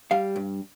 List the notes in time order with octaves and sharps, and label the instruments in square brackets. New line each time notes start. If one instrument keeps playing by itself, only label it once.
[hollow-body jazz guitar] G3 F5
G2